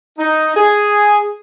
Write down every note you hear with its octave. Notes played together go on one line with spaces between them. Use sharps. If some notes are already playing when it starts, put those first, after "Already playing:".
D#4
G#4